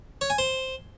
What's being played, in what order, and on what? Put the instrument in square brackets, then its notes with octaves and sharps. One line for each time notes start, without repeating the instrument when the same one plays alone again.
[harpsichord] C#5
G#5
C5